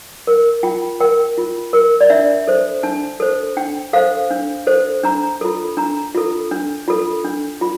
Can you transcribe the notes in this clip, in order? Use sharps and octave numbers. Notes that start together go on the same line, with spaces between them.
A#4
F4 G5
A#4 G5
F4
A#4
D5
D4 E5
A4 C5
D4 A5
A4 C5
D4 G5
A4 C5 F5
D4
A4 C5
D4 A#5
F4 A4
D4 A#5
F4 A4
D4
F4 A4
D4
F4